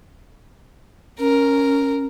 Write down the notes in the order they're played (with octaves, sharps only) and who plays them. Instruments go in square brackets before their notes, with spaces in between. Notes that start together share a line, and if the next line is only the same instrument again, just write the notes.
[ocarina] C#4 [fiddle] A#4